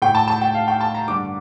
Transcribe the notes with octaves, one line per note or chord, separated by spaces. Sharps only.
A2 G5
A5
A5
G5
F5
G5
A5
A#5
G2 D3 D6